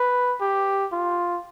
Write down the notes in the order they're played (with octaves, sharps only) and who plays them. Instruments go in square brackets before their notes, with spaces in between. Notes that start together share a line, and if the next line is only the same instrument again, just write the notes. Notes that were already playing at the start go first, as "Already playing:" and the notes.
Already playing: [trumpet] B4
G4
F4